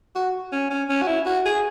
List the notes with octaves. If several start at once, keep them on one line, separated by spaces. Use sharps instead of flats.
F#4
C#4
C#4
C#4
F#4
E4
F#4
G#4